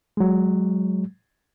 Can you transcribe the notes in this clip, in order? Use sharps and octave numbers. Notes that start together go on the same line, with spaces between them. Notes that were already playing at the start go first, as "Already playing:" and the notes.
F#3 G#3